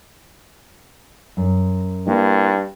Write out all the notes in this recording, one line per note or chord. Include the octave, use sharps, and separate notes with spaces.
F#2
G2 A#3 E4